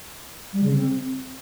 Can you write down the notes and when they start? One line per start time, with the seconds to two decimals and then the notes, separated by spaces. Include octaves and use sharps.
0.53 G3
0.63 C#3
0.74 C4